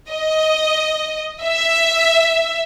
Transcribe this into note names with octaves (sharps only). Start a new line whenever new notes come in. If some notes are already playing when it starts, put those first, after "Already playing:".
D#5
E5